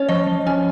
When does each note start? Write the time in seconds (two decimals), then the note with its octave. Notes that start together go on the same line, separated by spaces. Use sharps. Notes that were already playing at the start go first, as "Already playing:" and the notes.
Already playing: C#4 C#5
0.09 F3 D#5
0.27 F3
0.47 C#4 G#5